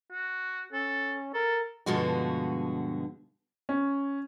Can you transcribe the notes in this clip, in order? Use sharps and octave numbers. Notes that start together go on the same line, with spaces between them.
F#4
C#4 A4
A4 A#4
G2 B2 D3 F3 G#3 F#4
C#4